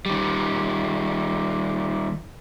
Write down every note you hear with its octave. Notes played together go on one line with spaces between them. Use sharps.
D#3 G3